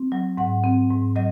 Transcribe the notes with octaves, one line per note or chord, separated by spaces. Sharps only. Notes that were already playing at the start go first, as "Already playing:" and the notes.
Already playing: C4
F#3
G#2 F#5
C4
G#2
F#3 D#5